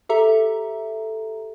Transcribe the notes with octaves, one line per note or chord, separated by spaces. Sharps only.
G4 A4 E5 A#5